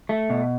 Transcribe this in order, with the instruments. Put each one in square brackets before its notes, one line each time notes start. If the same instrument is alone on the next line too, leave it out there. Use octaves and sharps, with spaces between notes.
[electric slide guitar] A3
B2